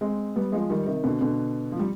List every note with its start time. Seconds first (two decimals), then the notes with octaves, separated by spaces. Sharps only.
0.01 G#3 C4
0.36 G3 B3
0.52 F3 G#3
0.70 D#3 G3
0.86 C3 D#3
1.04 B2 D3
1.21 B2 D3
1.72 F3
1.79 G3